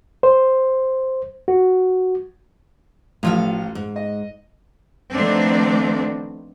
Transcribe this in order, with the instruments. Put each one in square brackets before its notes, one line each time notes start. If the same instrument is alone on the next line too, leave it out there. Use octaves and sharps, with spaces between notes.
[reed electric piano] C5
F#4
[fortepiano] A1 F4 [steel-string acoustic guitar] A2 F3 F5
[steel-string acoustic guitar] G#2
[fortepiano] D#5
[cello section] D#3 F3 A3 B3 C4 D4